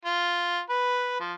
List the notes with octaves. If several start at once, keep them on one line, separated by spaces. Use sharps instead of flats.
F4
B4
F3